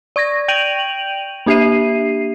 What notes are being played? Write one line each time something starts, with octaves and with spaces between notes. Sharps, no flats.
D5 C#6 G#6 A#6
G5 G6 D7 D#7 F7 F#7
A#3 D4 G4 E5 C7 D#7